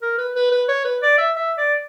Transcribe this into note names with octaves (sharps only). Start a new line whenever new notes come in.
A#4
B4
B4
B4
C#5
B4
D5
E5
E5
D5